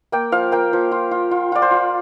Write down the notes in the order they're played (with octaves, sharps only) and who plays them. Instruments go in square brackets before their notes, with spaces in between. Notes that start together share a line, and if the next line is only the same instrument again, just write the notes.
[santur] A#3 G5
F3 F5
A#3 G5
F3
F4
F4
F4
F4 D5
C5
F4